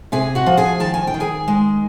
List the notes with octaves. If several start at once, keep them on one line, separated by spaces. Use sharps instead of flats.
C3 G#4 G#5
F#4 F#5
F3
G#4 G#5
D#3 A5
G#5
G5
D#3
G#4 G#5
G#3